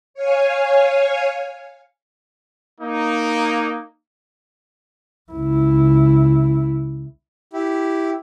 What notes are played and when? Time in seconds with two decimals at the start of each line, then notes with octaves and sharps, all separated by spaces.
0.14 C#5 F5 G#5
2.80 A#3 D#4
5.32 C#2 E4
7.53 E4 G4